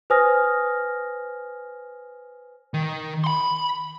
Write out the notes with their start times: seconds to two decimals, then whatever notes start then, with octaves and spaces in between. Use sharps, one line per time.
0.10 B4 C5 G#5 D#6 F6 A#6
2.74 D#3
3.24 B5 C6